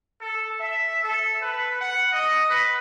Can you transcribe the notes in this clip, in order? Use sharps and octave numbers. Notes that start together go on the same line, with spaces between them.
A4
E5
A4
B4
F#5
D#5
B4